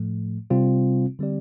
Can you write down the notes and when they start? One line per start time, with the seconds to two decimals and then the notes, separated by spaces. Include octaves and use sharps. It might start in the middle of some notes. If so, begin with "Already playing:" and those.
Already playing: A2 F3 A3
0.50 C3 G3 C4 F4
1.19 D3 G3 C4 G4 D5